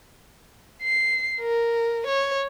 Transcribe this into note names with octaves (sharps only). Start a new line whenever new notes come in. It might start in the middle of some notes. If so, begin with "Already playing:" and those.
C7
A#4
C#5